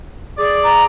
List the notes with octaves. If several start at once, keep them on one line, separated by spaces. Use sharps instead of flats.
G#4 D5
A#5